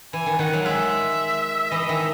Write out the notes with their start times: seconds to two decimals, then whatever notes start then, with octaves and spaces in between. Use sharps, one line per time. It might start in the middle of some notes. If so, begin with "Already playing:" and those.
0.13 E3 G#5
0.26 D#3
0.39 D#3 F#5
0.53 F#3
0.65 G#3 E5
1.71 E3 D#5
1.89 D#3 E5